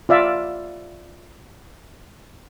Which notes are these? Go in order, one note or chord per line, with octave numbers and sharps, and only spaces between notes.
F4 D5 E5 F5